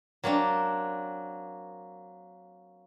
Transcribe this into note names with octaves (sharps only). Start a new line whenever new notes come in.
F#3 A#3 C4 D4